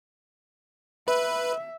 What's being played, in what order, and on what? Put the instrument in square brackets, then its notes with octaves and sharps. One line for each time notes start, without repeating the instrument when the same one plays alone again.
[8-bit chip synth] B4 [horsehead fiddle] E5